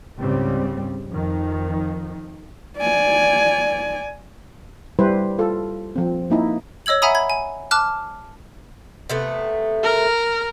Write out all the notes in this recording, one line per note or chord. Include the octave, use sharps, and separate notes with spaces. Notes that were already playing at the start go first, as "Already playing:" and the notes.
C#2 G#2 C#3 G3 C4
F2 D#3 F3
D5 G#5
G3 E4 B4 C5
F4 A4
F3 C4
A#3 D#4 E4
C#5 D#5 E6 G#6 F#7
E5 F#5 G#5 A#5 B5 D#6
B5 G#6
G#5
A5 D6 F6 F#6
C3 A3 B3
A#4